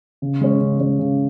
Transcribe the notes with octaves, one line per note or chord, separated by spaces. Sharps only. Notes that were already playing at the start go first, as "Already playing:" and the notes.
C#3
G#3 C#4
C#3
G#3 C#4
C#3